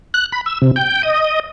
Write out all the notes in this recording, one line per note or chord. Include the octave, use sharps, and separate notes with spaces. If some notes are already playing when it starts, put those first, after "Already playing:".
F#6
B5
E6
C3
G5
D#5